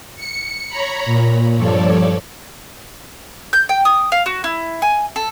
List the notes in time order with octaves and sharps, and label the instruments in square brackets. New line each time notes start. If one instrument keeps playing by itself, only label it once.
[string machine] C#7
C#5 A#5 B5
A#2
G2 F3 A4 C#5 D5
[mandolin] G6
G5
D#6
F5
F#4
E4
G#5
A4